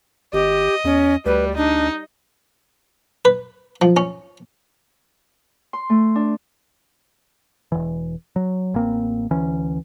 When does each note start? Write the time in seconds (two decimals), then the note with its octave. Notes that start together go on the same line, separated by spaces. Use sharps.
0.33 G#1 G4 D#5
0.84 E2 C#4
1.26 D2 G3 B4
1.57 D4 D#4
3.25 B4
3.82 F3
3.97 C#4
5.73 C6
5.90 A3
6.15 D4
7.72 E1 E3
8.36 F#3
8.74 A1 A#3 C4
9.31 D2 E3 C#4